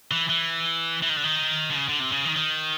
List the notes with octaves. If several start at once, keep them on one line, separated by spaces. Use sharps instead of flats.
E3
E3
E3
D#3
D3
D#3
D3
C#3
D3
C3
C#3
D#3
D#3